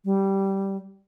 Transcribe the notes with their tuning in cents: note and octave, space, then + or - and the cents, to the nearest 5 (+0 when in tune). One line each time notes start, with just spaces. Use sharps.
G3 -10